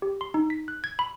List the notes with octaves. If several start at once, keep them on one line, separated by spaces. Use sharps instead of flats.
G4
C6
D#4
B6
F#6
G#6
B5